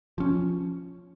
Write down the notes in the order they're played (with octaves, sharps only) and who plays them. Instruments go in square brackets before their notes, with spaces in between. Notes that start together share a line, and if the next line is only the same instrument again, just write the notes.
[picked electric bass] F3 C#4